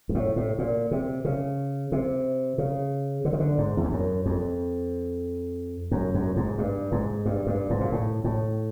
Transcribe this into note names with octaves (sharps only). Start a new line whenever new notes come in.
G#2
A2
A2
A#2
C3
C#3
C3
C#3
D3
D#3
D3
G#2
E2
F2
F#2
F2
F#2
F#2
G#2
G2
G#2
G2
G2
G#2
A#2
A2
A2